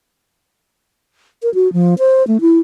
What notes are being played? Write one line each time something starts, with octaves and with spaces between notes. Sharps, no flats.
A#4
F#4
F3
C5
A3
E4